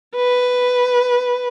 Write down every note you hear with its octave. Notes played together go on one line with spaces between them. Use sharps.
B4